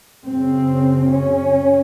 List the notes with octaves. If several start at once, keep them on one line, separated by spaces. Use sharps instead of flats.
F#2 C#3 C4
C#4